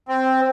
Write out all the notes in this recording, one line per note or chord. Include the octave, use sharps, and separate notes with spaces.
C4